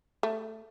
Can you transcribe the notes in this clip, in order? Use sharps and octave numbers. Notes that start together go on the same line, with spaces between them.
A3